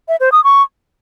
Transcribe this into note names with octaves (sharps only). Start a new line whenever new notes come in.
E5
C5
D#6
C#6